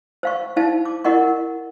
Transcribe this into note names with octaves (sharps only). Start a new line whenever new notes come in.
C5 F5 C#6
D#4 E4 C5 F5 A5
D6
E4 A#4 D#5 F#5 C#6